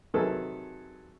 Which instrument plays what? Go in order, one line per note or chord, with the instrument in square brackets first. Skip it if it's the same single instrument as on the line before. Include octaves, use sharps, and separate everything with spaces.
[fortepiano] C3 D#3 F#3 G#4 A4 B4